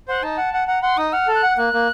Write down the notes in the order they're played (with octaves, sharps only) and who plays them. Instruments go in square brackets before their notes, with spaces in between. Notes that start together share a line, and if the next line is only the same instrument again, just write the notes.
[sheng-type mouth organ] C5 [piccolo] F#5
[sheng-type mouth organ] D#4 [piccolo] A5
[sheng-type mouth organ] F#5
F#5
[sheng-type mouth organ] F#5 [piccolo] A#5
[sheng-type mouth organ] F#5 [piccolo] C6
[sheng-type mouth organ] D#4 [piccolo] D#6
[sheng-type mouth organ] F#5 [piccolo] F6
[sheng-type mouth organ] A4
[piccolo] F#6
[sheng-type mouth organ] F#5
[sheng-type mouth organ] A#3 [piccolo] F#6
[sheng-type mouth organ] A#3